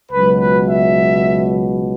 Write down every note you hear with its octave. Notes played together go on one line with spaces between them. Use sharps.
C#2 B2 F#3 B4
B4
E5